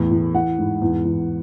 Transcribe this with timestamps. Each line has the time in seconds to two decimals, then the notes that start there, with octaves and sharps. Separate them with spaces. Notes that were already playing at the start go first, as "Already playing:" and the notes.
Already playing: E2 A2
0.11 E2
0.34 E3 F#5
0.59 G#2
0.82 E2
1.05 E2